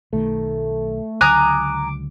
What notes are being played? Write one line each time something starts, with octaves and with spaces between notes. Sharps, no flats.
B1 D#3 A3
C#2 D3 F#3 G#5 A#5 D6 D#6 F#6